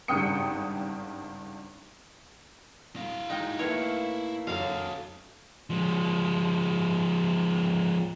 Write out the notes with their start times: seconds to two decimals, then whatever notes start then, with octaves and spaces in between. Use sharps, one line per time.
0.08 G#1 G2 C#3 G5 D#6 C#7
2.96 E4 F5 A#6
3.30 G#2 G#3 D#4 G5
3.59 A2 A3 A#3 B4 C#5 E5
4.47 F#2 F#4 A4 F5
5.70 F3 G#3